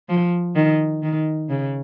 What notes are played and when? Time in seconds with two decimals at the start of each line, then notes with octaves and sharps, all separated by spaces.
0.09 F3
0.55 D#3
1.03 D#3
1.49 C#3